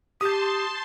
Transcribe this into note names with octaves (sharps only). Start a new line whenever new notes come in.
G4 A5 C6 D#6 G6